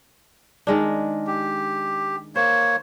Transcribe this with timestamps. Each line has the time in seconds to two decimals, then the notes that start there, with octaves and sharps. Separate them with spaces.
0.67 D#3 G#3 D4
1.27 G4
2.36 A#3 C5 C#5